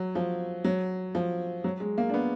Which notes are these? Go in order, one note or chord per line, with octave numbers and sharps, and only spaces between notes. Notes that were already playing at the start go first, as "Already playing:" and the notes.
Already playing: F#3
F3
F#3
F3
F#3
G#3
A#3
D4
B3